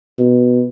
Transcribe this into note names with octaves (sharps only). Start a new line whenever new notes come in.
B2